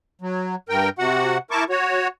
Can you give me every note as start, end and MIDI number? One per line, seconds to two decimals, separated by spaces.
0.22 0.55 54
0.69 0.89 43
0.69 0.89 70
0.69 0.89 79
0.99 1.38 48
0.99 1.38 66
0.99 1.38 78
1.51 1.64 64
1.51 1.64 70
1.51 1.64 81
1.51 1.64 85
1.51 1.64 86
1.70 2.08 66
1.70 2.08 73